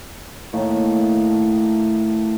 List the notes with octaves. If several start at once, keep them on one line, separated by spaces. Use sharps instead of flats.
A2 D#3 A3 A#3